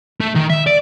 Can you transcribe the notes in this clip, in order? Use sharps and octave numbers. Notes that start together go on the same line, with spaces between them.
A3
D#3
E5
D5